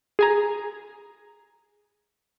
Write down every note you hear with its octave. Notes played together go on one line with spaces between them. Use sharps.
G#4 G#5 A#5